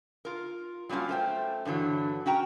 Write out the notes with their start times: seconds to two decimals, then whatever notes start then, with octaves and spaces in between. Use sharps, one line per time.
0.25 F4 A#4
0.89 F#3 G3 A#3 C#4 F4
1.09 A3 C5 G5
1.65 G2 D3 E3 F#3
2.26 C#4 F#4 G5 A#5